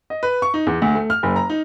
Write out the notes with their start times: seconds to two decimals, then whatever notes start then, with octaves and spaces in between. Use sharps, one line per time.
0.10 D#5
0.23 B4
0.42 C#6
0.54 D#4
0.67 E2
0.82 D2
0.95 A3
1.10 F6
1.23 F#1
1.36 A#5
1.50 D#4